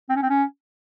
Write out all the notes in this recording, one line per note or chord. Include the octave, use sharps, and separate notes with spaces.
C4
C#4
C4
C#4